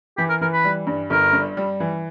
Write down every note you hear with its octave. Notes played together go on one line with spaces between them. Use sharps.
E3 G4
A#4
E3 A#4
B4
G3
G2
G1 A#4
G2
G3
E3